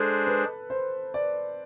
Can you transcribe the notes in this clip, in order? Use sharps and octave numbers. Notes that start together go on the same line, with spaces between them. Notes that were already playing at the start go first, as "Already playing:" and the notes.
Already playing: G#3 D4 G#4 A4 C5
B4
C5
D5